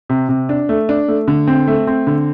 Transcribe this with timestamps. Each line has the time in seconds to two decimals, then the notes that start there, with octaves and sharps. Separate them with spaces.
0.09 C3
0.29 C3
0.49 D4
0.69 A3
0.89 D4
1.08 A3
1.28 D3
1.48 C4
1.67 A3
1.87 C4
2.07 D3